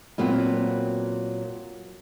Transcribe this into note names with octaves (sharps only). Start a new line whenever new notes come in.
A#2 F#3 B3 C4